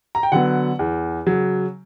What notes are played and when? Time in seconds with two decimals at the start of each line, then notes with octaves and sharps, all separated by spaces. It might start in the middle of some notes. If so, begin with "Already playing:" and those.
0.15 A#5
0.23 G5
0.32 D3 F#3 B3 F#5
0.79 E2
1.27 C#3 F#3